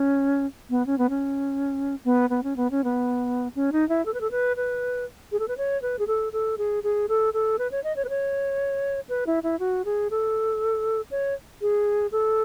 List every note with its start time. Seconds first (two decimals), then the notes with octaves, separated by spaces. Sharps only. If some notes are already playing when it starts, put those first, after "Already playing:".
Already playing: C#4
0.70 B3
0.86 C#4
0.98 B3
1.10 C#4
2.05 B3
2.30 B3
2.43 C#4
2.57 B3
2.71 C#4
2.84 B3
3.55 C#4
3.72 D#4
3.89 E4
4.06 A4
4.14 B4
4.21 A4
4.31 B4
4.56 B4
5.32 G#4
5.39 A4
5.48 B4
5.58 C#5
5.82 B4
5.99 G#4
6.07 A4
6.33 A4
6.58 G#4
6.83 G#4
7.09 A4
7.34 A4
7.59 B4
7.71 C#5
7.84 D#5
7.96 C#5
8.05 B4
8.09 C#5
9.09 B4
9.27 E4
9.43 E4
9.59 F#4
9.85 G#4
10.11 A4
11.11 C#5
11.61 G#4
12.12 A4